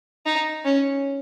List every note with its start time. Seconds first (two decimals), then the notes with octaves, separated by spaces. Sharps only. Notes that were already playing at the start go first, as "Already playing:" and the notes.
0.26 D#4
0.65 C#4